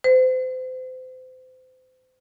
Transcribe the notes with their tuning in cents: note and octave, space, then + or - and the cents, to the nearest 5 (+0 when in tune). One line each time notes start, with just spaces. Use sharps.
C5 -35